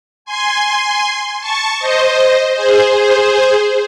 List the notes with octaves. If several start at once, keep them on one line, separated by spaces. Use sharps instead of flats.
G#5 C6
A5 C#6
C5 D#5
G#4 C5
G#4 C5